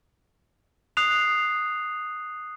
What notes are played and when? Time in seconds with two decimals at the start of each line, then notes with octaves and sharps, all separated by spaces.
0.97 D#6 F#6 C7 F7